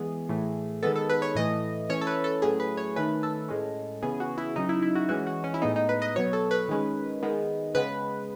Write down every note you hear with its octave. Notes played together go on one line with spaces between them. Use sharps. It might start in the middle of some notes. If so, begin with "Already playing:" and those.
Already playing: E3 G#3 B3 G#4
A2 E3 A3
D#3 G#3 B3 A4
A4
B4
C#5
A2 E3 A3 D#5
E3 A3 C#4 C#5
A4
B4
A4
A2 F#3 A3 C#4 G#4
B4
C#5
D#3 A3 C#4 B4
A4
A2 G#3 C#4
C#3 E3 B3 G#4
F#4
E4
C#3 F#3 C#4 D#4
E4
E4
F#4
E3 G#3 C#4 F#4
F#4
C#4
E4
A2 G#3 B3 D#4
D#4
B4
D#5
B2 F#3 B3 C#5
A4
B4
D#3 G#3 C#4
D#3 G#3 B3
C#3 G#3 B3 B4